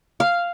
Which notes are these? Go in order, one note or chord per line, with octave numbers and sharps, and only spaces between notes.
F5